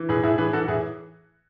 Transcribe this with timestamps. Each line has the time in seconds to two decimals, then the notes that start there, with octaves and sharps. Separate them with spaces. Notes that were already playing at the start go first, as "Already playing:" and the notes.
Already playing: E3
0.09 A2 G#4 B4
0.23 A2 E4 G#4
0.38 E3 G#4 B4
0.53 E3 F#4 A4
0.68 A2 E4 G#4